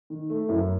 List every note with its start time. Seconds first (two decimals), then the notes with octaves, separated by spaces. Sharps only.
0.10 D#3
0.30 A3
0.49 F#2 E4